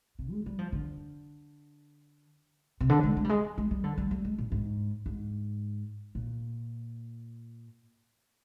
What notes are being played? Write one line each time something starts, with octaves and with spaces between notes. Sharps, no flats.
C3
G#3
G3
F3
D3
C3
D3
G#3
G#3
G3
G#3
G#3
G3
D3
G3
G3
G#3
A#2
G#2
G#2
A#2